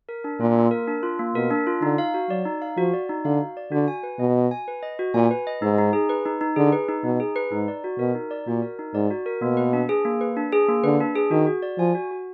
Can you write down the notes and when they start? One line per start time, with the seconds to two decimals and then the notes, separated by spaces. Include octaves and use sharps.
0.09 A#4
0.24 D4
0.40 A#2 F4
0.55 A#3
0.71 A#4
0.87 D4
1.03 F4
1.19 A#3
1.35 B2 A#4
1.51 D4
1.67 F4
1.82 D3 D#4
1.98 F5
2.14 F#4
2.30 F#3 D5
2.45 D#4
2.62 F5
2.77 F3 F#4
2.93 D5
3.09 D#4
3.25 D3 F5
3.41 F#4
3.57 D5
3.72 D3 F#4
3.88 G#5
4.03 B4
4.19 B2 D#5
4.35 F#4
4.51 G#5
4.68 B4
4.83 D#5
4.99 F#4
5.14 A#2 G#5
5.31 B4
5.47 D#5
5.62 G#2 D#4
5.78 D#4
5.93 G#4
6.09 B4
6.26 D#4
6.41 D#4
6.56 D3 G#4
6.72 B4
6.89 D#4
7.04 B2 D#4
7.20 G#4
7.36 B4
7.52 G#2 D#4
7.68 D5
7.84 F#4
7.99 B2 A#4
8.15 D#4
8.31 D5
8.47 A#2 F#4
8.62 A#4
8.79 D#4
8.94 G#2 D5
9.11 F#4
9.26 A#4
9.41 B2 A#3
9.57 B4
9.73 D4
9.89 G#4
10.05 A#3
10.21 B4
10.37 D4
10.52 G#4
10.68 A#3
10.84 D3 B4
11.00 D4
11.16 G#4
11.31 D#3 F#4
11.47 F#4
11.62 D5
11.78 F3 G#5
11.95 F#4
12.11 F#4